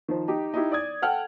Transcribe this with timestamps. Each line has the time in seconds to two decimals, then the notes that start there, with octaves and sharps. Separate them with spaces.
0.08 D#3 F3 C5
0.28 D#4 G4
0.54 D#4 E4 G4
0.72 D5 D#6 G#6
1.02 A4 F#5 G5 F6